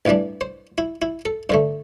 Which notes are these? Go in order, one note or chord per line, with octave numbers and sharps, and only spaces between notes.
A1 G2 E3 G3 D4
C5
E4
E4
A4
G2 D3 A3 C5